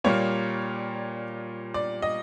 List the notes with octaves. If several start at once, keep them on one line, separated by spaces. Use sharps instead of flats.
A#2 G3 A#3 C#5
D5
D#5